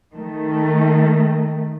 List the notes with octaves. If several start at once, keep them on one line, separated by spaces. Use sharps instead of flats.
D#3 A3